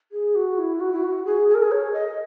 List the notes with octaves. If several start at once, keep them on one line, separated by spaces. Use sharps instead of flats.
G#4
F#4
E4
F#4
E4
F#4
G#4
G#4
A#4
G#4
C#5
D#5